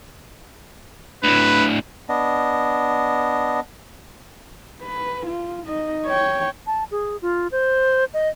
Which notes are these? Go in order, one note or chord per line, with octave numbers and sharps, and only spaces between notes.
D2 A2 B4
B3 D4 D#5
B4
F4
D#4 D#5
C#5 G5
A5
G#4
F4
C5
D#5